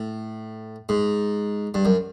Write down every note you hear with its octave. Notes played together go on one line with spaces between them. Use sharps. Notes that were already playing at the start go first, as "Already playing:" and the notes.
Already playing: A2
G#2
G2
F#2